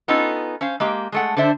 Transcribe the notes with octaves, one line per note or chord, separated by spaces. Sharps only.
B3 C#4 D#4 F4 A4
C#4 C5 F5
G#3 A#3 G4
G#3 A3 F#5
D3 D4 C5 E5